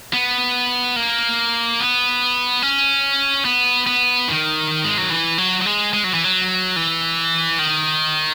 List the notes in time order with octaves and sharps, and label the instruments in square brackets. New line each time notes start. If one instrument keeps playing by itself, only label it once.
[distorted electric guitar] B3
A#3
B3
C#4
B3
B3
D#3
G#3
F#3
E3
F#3
F#3
G#3
G#3
F#3
E3
F#3
E3
D#3